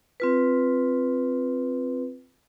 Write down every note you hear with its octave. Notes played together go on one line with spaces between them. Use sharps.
C4 F4 B4